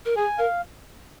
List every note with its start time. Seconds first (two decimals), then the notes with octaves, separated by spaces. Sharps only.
0.05 A#4
0.17 G#4 G#5
0.38 A#4 F5